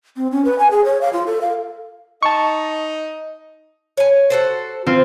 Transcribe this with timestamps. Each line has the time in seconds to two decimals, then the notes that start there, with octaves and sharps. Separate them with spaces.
0.17 C4
0.31 C#4
0.45 B4
0.59 G#5
0.71 G#4
0.85 C#5
1.01 F5
1.13 F4
1.27 A4
1.41 F5
2.23 D#4 D#5 A5 C#6
3.97 C#5 G#5
4.30 F#4 A4 C5
4.86 C4 F4